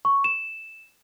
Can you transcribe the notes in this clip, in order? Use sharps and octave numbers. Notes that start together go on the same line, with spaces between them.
C#6
E7